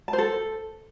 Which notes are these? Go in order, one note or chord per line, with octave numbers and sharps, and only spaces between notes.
A5
C5
A4